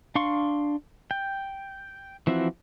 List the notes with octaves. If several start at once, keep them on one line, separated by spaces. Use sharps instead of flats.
D4 F5 C6 C#6
G5
E3 F3 C4 E4 F#4